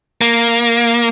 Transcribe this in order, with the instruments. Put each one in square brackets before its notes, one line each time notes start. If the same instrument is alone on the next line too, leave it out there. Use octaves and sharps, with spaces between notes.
[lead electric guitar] A#3